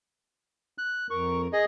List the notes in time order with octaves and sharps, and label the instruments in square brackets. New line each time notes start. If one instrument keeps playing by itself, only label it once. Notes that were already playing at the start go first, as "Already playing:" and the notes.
[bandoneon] F#6
[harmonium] F2 A#4 [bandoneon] C#6
[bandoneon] G#4 D#5